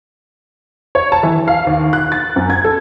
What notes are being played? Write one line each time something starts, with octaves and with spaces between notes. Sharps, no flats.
C#5
A5
E3
F5
D#2
F#6
A6
F#2
G#6
A4